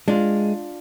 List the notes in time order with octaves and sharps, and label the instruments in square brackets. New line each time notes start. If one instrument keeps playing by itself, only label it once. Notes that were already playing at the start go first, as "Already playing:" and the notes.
[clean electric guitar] G#3 [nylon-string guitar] D4 F4